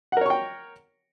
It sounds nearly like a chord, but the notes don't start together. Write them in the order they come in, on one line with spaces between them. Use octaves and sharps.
F#5 A#4 C#5 C#6 G5